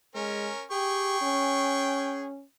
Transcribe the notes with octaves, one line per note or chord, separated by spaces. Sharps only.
G#3 C#4 A#4
G4 G#4 G5 C#6
C#4